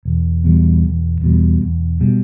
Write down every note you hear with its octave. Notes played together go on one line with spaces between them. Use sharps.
E1
E2 B2 G3
E1
E2 B2 G3
E1
B2 G3